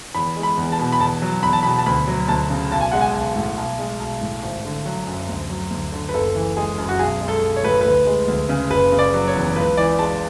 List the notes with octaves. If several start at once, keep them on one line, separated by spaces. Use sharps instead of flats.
E2 B5
G#3
B5
E2
A5
B2
B5
E2 A5
F#3
E2 B5
A5
B2 B5
A5
D2 B5
F#3
D2 A5
C#3
B1 A5
G#5
G#3 F#5
G#5
B1
A2
B1
G#3
B1
A2
G#1
D3
F#3
F#2
D2
F#3
D2
D3
B4
F#1 A4
E3
G#3 G#4
F#2
F#4
B1 G#4
G#3
A4
B1
C#5
A2 B4
A4
D2 B4
G#3
D2
C#3
F#1 B4
C#3
D5
F#3
C#5
E2
C#2 B4
E3 D5
G#3 A5